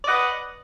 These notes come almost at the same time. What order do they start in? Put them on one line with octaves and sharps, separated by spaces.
D5 D#5 F#5 B4